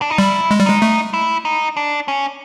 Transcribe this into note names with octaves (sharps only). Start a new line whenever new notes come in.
D4
D#4
G3 E4
G#3
G3
G#3 D#4
A3
E4
D#4
D4
C#4